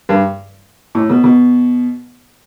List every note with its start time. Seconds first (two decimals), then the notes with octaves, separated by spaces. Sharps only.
0.09 G2
0.95 A2
1.10 B2
1.24 B2